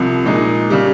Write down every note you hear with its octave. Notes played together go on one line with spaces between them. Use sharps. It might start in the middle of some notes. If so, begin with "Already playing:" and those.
Already playing: C2 C3 F3
A#2 G#3 D#4
C#3 G3